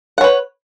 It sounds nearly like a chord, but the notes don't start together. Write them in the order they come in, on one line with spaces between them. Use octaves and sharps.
F#5 C#5 B4